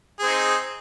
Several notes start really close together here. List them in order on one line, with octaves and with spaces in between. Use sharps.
G#4 C4 D#4